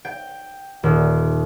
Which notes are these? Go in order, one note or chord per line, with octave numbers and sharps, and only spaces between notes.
G5
D#1